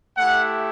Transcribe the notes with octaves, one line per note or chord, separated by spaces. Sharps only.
A3 E4 G4 F#5